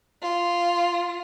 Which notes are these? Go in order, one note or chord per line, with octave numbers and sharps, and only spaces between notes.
F4